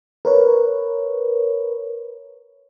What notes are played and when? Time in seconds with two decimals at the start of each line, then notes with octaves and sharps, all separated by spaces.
0.25 A#4 B4 C#5